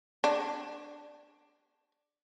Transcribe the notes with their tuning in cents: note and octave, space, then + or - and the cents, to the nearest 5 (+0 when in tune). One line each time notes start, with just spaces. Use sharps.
D4 +5